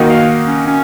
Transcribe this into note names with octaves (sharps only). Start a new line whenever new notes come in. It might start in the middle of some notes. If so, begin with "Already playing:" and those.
Already playing: D#3 A#3 D#4 F#4
F5
C#4
C#4